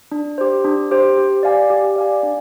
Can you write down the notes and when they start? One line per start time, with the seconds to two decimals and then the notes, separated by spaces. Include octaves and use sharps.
0.12 D4
0.38 G4 C5
0.65 D4
0.91 G4 C5
1.18 G4
1.43 D5 F5 G#5
1.70 G4
1.96 D5 F5 G#5
2.23 D4